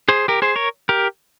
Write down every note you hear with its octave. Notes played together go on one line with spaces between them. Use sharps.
G#4 C5
G4 A#4
G#4 C5
A#4 C#5
G4 A#4